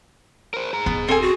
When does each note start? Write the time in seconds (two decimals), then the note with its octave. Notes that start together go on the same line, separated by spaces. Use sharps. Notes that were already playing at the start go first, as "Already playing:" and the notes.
0.54 A#4 C5
0.73 G#4 A#5
0.86 D#1 B3
1.08 C4 A4 G#5
1.22 F#4